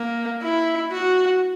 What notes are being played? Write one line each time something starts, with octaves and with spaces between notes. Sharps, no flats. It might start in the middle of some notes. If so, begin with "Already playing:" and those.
Already playing: A#3
E4
F#4